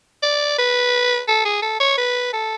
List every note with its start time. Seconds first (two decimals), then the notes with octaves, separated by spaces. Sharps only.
0.23 D5
0.58 B4
1.28 A4
1.45 G#4
1.62 A4
1.80 C#5
1.98 B4
2.33 A4